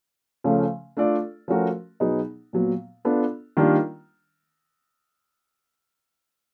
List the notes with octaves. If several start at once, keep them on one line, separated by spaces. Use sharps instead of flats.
C#3 F3 A3 C#4
A3 D4 F4 A4 D5
F3 A3 C#4 F#4 A#4
B2 F#3 B3 D#4 G#4
A#2 F#3 B3
B3 D4 F4 A4
D#3 G3 A#3 D4 F4